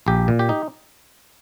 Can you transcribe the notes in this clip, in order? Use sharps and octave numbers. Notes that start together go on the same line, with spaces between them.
A#1 G4
A#2
G4
D#4